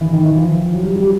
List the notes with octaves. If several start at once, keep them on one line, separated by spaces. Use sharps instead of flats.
E3
D#3
E3
F3
F#3
G3
G3